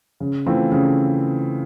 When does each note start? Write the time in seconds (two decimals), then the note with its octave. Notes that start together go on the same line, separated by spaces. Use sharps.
0.20 C#3
0.46 E3 A3 C4 F4
0.72 C#3